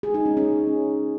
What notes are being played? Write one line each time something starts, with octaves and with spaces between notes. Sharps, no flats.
G#4
D#4
C#4
C#4